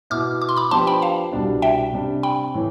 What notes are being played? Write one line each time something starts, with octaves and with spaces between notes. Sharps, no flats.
B2 B3 E4 D6 F6
D6
C6
B5 D6
F3 B3 D4 G4 C5 A5 C6
G5 B5
F5 A5
C2 B2 G3 D4
E5 G5
C3 G3 D4 G4
G5 B5
A2 E3